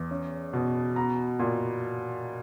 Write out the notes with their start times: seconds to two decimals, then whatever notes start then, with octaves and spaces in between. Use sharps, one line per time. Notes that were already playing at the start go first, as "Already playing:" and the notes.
Already playing: E2
0.11 C#4
0.53 B2
0.96 B3 A#5
1.39 A#2